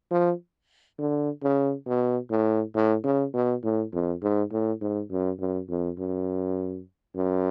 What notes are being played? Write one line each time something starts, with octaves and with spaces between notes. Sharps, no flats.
F3
D3
C#3
B2
A2
A2
C#3
B2
A2
F2
G#2
A2
G#2
F#2
F#2
F2
F#2
F#2